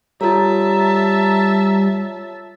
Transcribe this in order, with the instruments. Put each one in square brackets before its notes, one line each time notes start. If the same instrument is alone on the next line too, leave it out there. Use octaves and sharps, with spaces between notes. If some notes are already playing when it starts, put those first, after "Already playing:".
[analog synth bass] G3 [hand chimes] F4 A4 C#5 [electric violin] E5 A5 [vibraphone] A#5